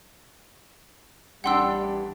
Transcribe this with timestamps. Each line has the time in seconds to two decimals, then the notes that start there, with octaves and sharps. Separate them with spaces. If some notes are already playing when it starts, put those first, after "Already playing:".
1.44 A1 G3 B3 D4 F#5 G5 C6 E6